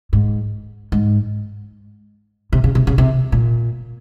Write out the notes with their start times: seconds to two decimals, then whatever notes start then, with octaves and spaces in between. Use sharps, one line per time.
0.13 G#2
0.92 G#2
2.53 C3
2.64 C#3
2.75 C3
2.87 C#3
2.98 C3
3.32 A#2